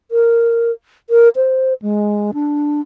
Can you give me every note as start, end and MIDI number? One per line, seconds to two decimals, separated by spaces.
0.11 0.71 70
1.10 1.29 70
1.36 1.74 72
1.82 2.31 56
2.34 2.81 62